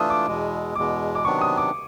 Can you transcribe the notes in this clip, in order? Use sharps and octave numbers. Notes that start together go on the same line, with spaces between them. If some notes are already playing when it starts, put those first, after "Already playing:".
Already playing: E3 A3 D4 F4 D#6 E6
D6
E2 B2 G#3
E2 B2 G#3 D6
D6
C3 D#3 F#3 B3 D4 C#6
D#6
D6